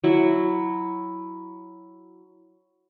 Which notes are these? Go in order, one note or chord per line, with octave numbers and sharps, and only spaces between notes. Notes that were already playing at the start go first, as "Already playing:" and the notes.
F#3 E4